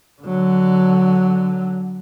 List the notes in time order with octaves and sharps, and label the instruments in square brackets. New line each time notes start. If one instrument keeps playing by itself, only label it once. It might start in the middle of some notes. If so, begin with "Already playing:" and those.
[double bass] D3 F#3